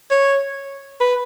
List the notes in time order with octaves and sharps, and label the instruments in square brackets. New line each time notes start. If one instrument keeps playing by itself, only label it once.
[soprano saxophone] C#5
B4